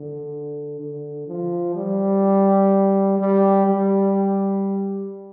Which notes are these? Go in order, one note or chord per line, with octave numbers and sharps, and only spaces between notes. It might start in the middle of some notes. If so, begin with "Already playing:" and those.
Already playing: D3
D3
F3
G3
G3
G3